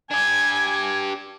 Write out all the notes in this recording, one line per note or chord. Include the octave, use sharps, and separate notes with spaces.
D4 G4 G#5